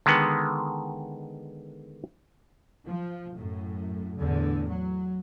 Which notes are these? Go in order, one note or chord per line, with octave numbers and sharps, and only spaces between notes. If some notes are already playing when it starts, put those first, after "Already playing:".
D3 D#3 G#3 B3
F3
F#2 A2
E2 A2 D3
F#3